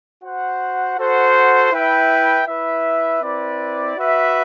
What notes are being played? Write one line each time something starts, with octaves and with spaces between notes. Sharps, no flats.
F#4 C5 F#5
F#4 A4 C5 F#5
E4 B4 E5 G5
E4 B4 E5
C4 E4 B4 D5
F#4 B4 E5